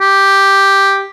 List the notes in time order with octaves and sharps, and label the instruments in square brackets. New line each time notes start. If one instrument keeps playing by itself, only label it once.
[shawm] G4